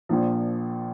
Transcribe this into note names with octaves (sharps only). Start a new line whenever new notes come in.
A#1 A#2 F3